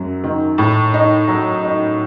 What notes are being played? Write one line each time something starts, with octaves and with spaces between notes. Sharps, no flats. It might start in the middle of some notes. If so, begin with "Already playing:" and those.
Already playing: F#2 F#3
D#3
A2
D#4
F#3
D#4